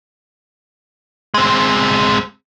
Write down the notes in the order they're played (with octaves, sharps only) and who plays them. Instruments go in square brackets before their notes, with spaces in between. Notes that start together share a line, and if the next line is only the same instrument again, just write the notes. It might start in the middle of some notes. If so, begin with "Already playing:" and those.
[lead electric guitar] G#3 C4